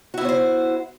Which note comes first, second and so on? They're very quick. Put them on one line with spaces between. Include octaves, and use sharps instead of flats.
F#4 E4 B3 C#5 C5